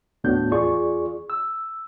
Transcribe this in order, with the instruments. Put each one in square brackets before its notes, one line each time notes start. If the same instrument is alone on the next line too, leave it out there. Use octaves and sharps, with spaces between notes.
[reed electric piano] D#2 A2 B3 D4 F#4 G6
E2 F4 G#4 D5 C#6
E6